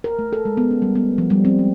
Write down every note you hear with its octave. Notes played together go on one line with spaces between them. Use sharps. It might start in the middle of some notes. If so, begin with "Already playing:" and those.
A#4
A3
A4
G#3
B3
C#4
G3
B3
F3
G3
C4
G#3